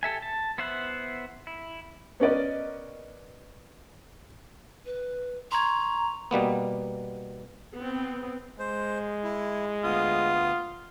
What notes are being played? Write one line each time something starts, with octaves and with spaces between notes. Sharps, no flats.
G4 A4 E5 G#5
A5
B3 E4 C5 E5 F#5
E4
B3 C#4 A#4 D5 D#5
B4
A#5 C6 C#6 G#6
B2 G3 A#3 B3
B3 C4
G#3 C5
E4
D2 B3 F4 D#6